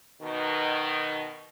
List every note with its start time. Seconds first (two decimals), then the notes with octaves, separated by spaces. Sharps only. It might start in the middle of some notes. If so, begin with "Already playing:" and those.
0.21 B2 D#3